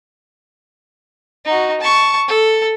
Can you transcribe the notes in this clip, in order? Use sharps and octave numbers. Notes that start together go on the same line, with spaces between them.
D#4 F#4
A5 C#6
A4